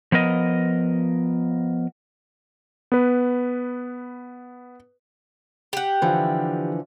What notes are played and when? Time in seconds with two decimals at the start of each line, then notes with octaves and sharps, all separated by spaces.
0.12 F3 B3 A#4 D#5
2.92 B3 B4
5.73 G4 F#5
6.02 D3 E3 F3